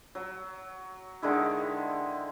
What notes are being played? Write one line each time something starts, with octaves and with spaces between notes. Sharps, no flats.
F#3
D3 D#3 G#3 E4